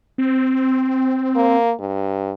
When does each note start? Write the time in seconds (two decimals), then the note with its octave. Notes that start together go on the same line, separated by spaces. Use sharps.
0.18 C4
1.35 A#3
1.80 G2